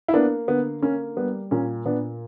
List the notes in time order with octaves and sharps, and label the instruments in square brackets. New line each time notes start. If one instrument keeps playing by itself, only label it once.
[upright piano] E4
A#3 B3 D4
D3 B3
A#3 C#4
G3 B3
A#2 C#4
A#2 B3 D4